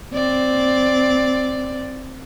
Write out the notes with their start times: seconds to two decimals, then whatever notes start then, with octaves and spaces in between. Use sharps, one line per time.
0.13 C4 D5